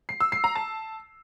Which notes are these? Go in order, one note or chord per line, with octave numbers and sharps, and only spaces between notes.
C7
E6
C7
A#5
A5